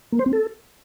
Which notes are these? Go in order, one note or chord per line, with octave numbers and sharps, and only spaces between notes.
A#3
C5
C4
A4